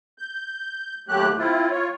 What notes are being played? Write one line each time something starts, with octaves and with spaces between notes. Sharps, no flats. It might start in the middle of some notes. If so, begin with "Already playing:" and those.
G6
D#2 F#3 A3 G4 F#6
C4 E4 F4
F4 C#5